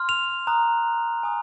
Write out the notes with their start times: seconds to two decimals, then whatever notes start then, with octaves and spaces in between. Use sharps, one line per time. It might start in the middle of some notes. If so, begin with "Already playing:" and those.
Already playing: C6 F6
0.09 F7
0.47 A#5 D#6 F#6
1.23 G#5 D#6